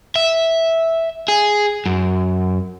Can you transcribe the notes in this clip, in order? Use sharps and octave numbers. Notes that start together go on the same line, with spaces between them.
E5
G#4
F#2